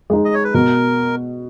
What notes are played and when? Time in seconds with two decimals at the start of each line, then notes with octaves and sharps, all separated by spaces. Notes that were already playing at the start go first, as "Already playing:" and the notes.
0.10 G#3 D#4
0.25 D#5
0.34 C#5
0.44 B4
0.54 B2 A#4